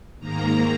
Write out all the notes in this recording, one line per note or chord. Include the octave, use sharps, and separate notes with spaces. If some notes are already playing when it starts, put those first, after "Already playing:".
G#2 D#3 A#3 A#5